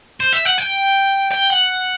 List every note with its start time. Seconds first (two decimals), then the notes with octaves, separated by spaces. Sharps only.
0.20 C5
0.33 E5
0.45 F#5
0.58 G5
1.32 G5
1.50 F#5